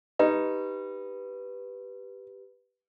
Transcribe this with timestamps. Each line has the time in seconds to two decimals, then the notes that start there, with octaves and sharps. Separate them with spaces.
0.19 D#4 G4 B4